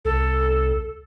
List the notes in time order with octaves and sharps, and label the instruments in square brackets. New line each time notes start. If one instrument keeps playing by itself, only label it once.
[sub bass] C2 [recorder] A4